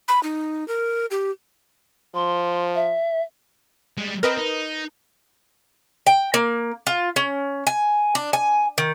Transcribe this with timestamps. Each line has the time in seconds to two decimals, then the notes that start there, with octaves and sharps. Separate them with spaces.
0.08 B5
0.23 D#4
0.68 A#4
1.11 G4
2.14 F3 C6
2.75 E5
3.97 G3 G#3
4.23 C4 A#4 B4 D#5
4.36 D#4
6.07 G5
6.34 A#3
6.87 F4
7.16 C#4
7.67 G#5
8.15 D4
8.33 G#5
8.78 D#3